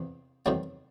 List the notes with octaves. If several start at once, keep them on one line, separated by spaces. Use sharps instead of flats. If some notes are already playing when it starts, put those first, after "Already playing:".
Already playing: E2 C3
E2 C3 D#3 F#3 G3 A3